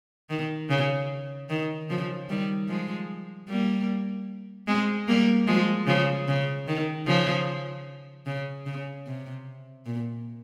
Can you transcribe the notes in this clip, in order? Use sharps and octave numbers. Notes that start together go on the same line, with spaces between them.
D#3
C#3
D#3
C#3 F3
D#3 G3
F3 G#3
G3 A#3
G#3 C4
G3 A#3
F3 G#3
C#3 F3
C#3
D#3
C#3 F3
C#3
C#3
C3
A#2